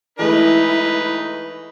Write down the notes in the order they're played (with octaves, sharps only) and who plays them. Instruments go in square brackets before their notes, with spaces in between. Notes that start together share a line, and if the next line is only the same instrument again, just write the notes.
[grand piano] E3 G#3 A3 [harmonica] D#4 B4 [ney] E4